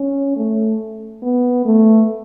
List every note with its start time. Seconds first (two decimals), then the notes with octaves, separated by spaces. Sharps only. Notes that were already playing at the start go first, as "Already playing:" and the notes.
Already playing: C#4
0.36 A3
1.22 B3
1.65 A3